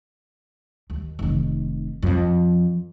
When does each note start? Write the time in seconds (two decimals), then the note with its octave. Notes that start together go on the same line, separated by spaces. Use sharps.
0.90 D#2
1.19 F1 D#3
2.03 F2 F3